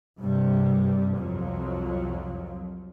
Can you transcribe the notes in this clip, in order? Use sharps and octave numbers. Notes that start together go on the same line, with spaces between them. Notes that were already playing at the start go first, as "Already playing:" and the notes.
G2 C3 G3
C2 F2 F3 F#3